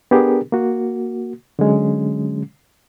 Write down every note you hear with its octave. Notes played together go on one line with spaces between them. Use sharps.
B3 D4 G4 G#4 A#4
A#3 F#4
D3 F#3 G#3 C#4